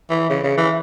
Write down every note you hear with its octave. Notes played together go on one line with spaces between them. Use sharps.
E3
C#3
C#3
E3